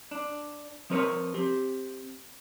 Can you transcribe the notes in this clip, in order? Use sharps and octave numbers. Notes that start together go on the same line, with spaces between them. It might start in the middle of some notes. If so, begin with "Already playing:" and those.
D4
F3 C4 A#4 B4 C#5
C4 G4